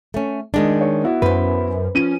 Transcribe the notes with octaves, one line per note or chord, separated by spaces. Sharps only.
A3 C#4
D#3 G#3 D4
C#5
B3 E4 F#4
F#2 B4 C5
F3 C#4 D#7